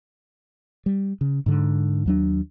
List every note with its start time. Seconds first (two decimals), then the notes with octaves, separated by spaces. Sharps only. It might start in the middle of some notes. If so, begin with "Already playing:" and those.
0.86 G3
1.21 C#3
1.46 G#2 D3
2.06 D#2 F#3 D4